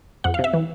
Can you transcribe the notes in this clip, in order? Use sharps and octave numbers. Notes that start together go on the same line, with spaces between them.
F2 F#5
F5
C3
E5
E3